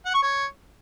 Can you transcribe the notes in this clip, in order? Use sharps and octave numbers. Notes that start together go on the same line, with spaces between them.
F#5
C#6
C#5